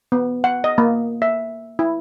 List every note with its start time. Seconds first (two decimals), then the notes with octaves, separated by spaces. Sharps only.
0.12 B3
0.44 F#5
0.64 D#5
0.78 A#3
1.22 E5
1.79 E4